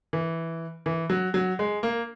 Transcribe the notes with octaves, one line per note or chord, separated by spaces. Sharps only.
E3
E3
F#3
F#3
G#3
A#3